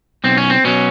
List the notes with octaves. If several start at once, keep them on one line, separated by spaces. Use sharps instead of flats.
B1 C4
C#4
C4
B2 F#3 C#4